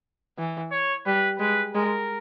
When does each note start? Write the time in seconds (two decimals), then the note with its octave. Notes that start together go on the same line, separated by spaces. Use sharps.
0.38 E3
0.72 C#5
1.06 G3 B4
1.39 G#3 B4
1.74 G#3 A#4